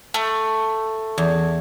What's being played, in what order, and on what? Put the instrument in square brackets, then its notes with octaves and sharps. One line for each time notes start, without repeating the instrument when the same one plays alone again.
[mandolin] A3
[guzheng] E2